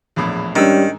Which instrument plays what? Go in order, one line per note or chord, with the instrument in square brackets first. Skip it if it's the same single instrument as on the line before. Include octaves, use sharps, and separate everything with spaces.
[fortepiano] A#1 E2 A2
[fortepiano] G#2 E6 [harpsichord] D#3 [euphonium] G3 [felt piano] C#4 D4